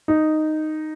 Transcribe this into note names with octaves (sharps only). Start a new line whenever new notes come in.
D#4